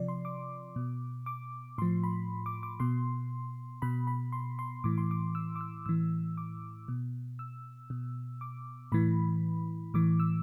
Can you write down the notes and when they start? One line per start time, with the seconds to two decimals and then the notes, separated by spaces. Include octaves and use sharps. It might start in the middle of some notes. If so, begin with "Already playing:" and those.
Already playing: C3 F3 D5
0.08 C6
0.25 D6
0.76 B2
1.26 D6
1.78 A2 F3 C6
2.04 B5
2.46 D6
2.63 D6
2.80 B2 C6
3.82 B2 B5
4.07 B5
4.32 C6
4.59 C6
4.84 A2 E3 D6
4.98 C6
5.11 D6
5.35 E6
5.56 D6
5.61 E6
5.86 A2 E3 E6
6.37 D6
6.88 B2
7.39 E6
7.90 B2
8.41 D6
8.92 A2 E3 B5
9.94 A2 E3 D6
10.20 E6